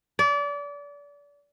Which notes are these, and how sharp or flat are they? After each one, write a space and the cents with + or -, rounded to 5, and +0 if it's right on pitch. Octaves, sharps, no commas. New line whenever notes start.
D5 -30